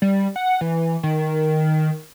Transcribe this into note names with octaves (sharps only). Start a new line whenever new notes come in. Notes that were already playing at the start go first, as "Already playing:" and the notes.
G3
F#5
E3
D#3